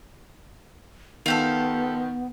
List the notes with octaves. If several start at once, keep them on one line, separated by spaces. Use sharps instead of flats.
D#3 B3 F4 G4 A4